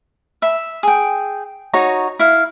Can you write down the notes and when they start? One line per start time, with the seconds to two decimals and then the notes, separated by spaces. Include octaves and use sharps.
0.42 E5 B5
0.83 G#4 G5
1.74 D#4 F#4 C#5 A#5
2.19 E4 F5